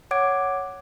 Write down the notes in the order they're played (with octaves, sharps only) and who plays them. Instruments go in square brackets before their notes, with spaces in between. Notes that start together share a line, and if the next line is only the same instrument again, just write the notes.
[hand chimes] C#5 F#5 D6 G#6 D7